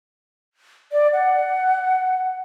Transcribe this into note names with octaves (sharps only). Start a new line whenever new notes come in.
D5
F#5